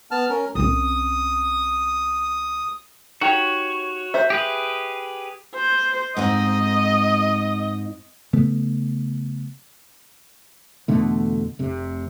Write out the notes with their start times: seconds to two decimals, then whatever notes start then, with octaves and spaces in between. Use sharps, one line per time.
0.11 B3 A5 F6
0.30 C#4 A#4
0.55 C2 C#4 D#6
3.21 D#4 F#4 G4 C#5
4.14 C5 E5
4.30 G4 G#4 B4
5.55 C5
6.17 G#2 C4 D#4 D#5
8.33 C#3 F3 A3 B3
10.88 E2 B2 D3 A3
11.59 F1 C3